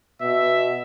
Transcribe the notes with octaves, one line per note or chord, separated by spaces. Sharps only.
B2 E5